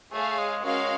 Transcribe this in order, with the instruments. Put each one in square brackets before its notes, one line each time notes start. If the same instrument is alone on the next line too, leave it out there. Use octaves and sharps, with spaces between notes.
[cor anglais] A3 [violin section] G#4 C#5 F5
[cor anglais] G#3
[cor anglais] G#3 [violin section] C#4 F#4 A#4 C#5 F5